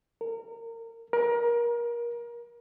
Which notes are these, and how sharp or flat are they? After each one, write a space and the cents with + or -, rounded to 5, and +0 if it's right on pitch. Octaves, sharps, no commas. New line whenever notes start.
A#4 -30
A#4 +25